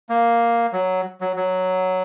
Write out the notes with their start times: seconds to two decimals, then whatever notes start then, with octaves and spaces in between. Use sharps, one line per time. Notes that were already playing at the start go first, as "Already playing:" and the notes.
0.09 A#3
0.73 F#3
1.21 F#3
1.36 F#3